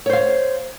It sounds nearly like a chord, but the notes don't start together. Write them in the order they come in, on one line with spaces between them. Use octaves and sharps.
C#5 C5 F5